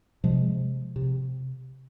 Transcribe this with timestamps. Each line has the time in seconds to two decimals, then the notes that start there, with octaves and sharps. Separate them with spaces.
0.24 C3 F3 G#3
0.96 C3